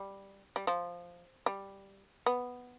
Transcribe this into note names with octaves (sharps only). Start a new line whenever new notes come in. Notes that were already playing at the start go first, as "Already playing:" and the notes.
Already playing: G3
G3
F3
G3
B3